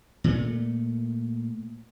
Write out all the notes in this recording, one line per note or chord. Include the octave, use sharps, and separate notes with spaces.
A#2 A3